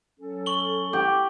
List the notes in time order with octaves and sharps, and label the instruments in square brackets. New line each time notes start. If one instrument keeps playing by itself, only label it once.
[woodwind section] F#3 C#4 A4
[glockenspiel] C#6 F#7 G7
[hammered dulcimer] G4